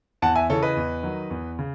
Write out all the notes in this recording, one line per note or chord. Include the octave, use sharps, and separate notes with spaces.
E2 F#5 A5
E5 G#5
C#3 E3 A4 C#5
B4 D#5
E2
D#3 F#3
E2
C#3